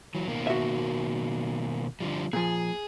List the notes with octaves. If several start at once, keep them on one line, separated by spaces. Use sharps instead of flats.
E3 F#3
B2 D#3 A#3
F#4 E5
D3 F3 G3
A#2 F3 G#4